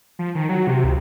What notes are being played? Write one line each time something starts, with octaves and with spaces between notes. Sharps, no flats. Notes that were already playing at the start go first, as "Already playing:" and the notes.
F3
D#3
F#3
C3
C#2